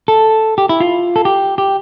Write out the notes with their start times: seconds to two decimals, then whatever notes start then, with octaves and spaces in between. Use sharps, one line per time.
0.08 A4
0.58 G4
0.69 E4
0.80 F4
1.16 A4
1.25 G4
1.58 G4